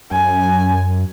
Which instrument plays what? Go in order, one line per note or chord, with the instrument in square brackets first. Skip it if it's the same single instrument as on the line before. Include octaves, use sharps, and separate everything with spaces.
[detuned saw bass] F#2 [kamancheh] G#5